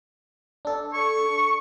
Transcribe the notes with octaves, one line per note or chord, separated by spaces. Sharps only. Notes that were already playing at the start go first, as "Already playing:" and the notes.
D4 A4
C#6